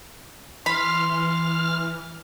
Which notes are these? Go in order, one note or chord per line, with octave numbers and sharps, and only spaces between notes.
E3 B5 C6 F6